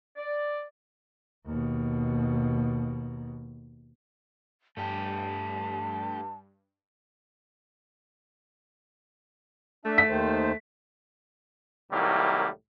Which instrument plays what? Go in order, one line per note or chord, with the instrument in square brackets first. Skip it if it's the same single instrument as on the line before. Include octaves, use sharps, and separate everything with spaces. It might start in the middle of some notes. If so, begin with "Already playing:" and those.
[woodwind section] D5
[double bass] D#2 B2
[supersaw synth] G2 [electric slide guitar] A3 G4 [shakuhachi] A5
[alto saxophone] A3 [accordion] D4 E5
[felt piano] B6
[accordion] D#2 D#3 C5
[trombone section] C2 A2 D#3 F#3 G3 A#3